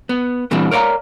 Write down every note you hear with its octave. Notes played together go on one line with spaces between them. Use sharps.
B3
A#2 E3 G3 C4 D4
A#4 C#5 D5 F5 A#5